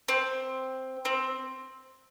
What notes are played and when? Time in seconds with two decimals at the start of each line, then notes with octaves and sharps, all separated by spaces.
0.08 C4
1.05 C4